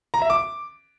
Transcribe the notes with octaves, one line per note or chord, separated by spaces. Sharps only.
A#5
E5
D6